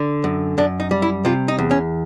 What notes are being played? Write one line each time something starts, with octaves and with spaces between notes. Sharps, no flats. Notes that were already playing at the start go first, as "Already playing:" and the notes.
Already playing: D3
F#2
F#2 D4
D#4
G3
E4
C3 F4
D#4
E2
C#4